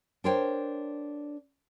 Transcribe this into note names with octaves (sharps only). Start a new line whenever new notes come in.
D4 A#4 C5 C#5 G5